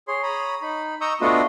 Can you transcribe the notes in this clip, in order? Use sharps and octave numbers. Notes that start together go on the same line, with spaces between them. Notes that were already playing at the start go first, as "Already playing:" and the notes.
G#4 C#5 C6
C#5 A#5 B5 D#6
D#4 B5
D#5 A#5 C#6 D#6 E6 G6
A3 B3 D4 F4 F#4 D#5